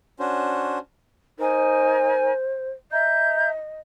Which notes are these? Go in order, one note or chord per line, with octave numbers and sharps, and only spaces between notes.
C#4 D4 F#4 C5
D#4 A#4 C5 G#5
D#5 E5 A#5 G6